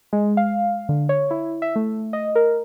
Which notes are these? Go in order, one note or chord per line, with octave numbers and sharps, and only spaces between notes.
G#3
F5
D3
C#5
E4
E5
A3
D#5
A#4